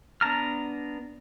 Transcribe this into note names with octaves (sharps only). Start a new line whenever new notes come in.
B3 D4 A5 A#5 F6